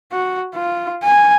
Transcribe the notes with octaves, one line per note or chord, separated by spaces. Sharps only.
F#4
F4
G#5